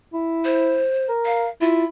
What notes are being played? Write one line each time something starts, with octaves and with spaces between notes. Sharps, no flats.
E4
C5
A#4
F5
E4 F4